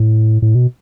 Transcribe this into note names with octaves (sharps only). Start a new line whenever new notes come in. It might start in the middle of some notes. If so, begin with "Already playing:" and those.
Already playing: A2
A2
B2